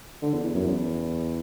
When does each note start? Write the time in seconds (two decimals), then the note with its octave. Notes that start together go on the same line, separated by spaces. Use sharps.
0.22 D3
0.33 E2
0.43 E2
0.55 F#2
0.65 E2